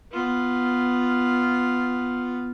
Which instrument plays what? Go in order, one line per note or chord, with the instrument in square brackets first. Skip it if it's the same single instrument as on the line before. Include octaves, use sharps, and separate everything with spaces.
[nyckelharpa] B3 F4